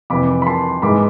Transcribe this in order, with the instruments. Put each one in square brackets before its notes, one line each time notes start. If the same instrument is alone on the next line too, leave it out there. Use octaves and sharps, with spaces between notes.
[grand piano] F2 C3 E3 B5 D6
B5
A5 C6
G#2 E3 G#3 B5 D6